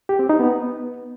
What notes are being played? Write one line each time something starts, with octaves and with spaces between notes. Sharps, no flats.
G4
C4
D#4
B3